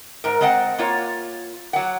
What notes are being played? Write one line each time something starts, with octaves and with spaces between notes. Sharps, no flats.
G#2 A#4
G#3 C4 D#5 F#5 A5
A#3 F4 C#5
F#3 F#5